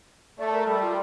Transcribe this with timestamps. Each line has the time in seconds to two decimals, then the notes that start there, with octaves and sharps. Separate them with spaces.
0.38 A3 D5
0.53 A#4
0.66 G3 A4
0.81 F4